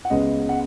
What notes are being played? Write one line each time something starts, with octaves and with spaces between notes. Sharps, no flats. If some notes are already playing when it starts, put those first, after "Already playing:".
F#5
C#2 C#3 G#3 B3 D#5
F#5